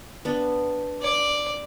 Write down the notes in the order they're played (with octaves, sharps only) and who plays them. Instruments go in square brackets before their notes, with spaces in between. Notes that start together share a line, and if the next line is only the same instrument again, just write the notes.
[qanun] B3 D4
[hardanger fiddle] D5